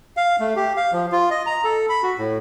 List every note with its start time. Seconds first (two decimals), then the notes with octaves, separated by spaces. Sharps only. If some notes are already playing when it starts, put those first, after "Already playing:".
0.17 F5
0.40 A3
0.56 G4
0.77 F5
0.93 F3
1.12 F4
1.31 D#5
1.46 A#5
1.64 A4
1.89 B5
2.03 F#4
2.18 A2